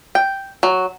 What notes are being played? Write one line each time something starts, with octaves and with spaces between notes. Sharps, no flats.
G5
F#3